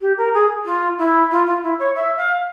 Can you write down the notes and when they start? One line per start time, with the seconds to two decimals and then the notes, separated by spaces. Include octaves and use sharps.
0.01 G4
0.18 A#4
0.34 G#4
0.65 F4
0.98 E4
1.31 F4
1.47 F4
1.63 E4
1.79 C#5
1.95 E5
2.17 F5